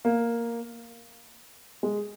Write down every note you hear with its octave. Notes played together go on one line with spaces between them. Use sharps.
A#3
G#3